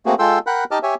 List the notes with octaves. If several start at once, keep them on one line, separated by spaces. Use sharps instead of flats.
A3 A#3 C4 F#4 G#4
G#3 F4 A4 G5 C6 E6
A#4 F#5 G5 B5 F#6
D#4 G4 D#5 A5 D6 F6
G4 C#5 E5 G#5